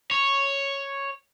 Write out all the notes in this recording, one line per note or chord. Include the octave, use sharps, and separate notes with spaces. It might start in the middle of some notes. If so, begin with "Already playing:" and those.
C#5